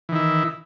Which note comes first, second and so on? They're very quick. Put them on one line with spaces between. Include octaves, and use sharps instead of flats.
E3 D#3 E4